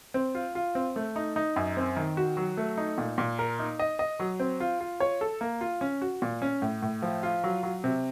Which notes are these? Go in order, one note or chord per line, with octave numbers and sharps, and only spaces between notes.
C4
F4
F4
C4
A3
D#4
D#4
F#2
C4
D#3
F#4
F#3
A3
D#4
A#2
A#2
A#4
D#4
D#5
D#5
F#3
C4
F4
F4
C#5
A4
A#3
F4
C#4
F#4
A#2
C#4
A2
A2
F3
F4
F#3
F#3
C3